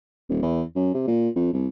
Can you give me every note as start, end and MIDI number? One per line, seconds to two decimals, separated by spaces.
0.29 0.38 27
0.43 0.63 40
0.76 0.91 42
0.94 1.07 48
1.07 1.29 46
1.36 1.51 41
1.53 1.67 36